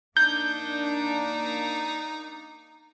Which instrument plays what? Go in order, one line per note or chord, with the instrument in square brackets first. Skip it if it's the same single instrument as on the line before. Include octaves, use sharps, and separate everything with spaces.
[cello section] A#3 D4 [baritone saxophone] D#4 [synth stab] G6